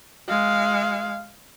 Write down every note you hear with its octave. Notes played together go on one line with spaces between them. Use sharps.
G#3 F5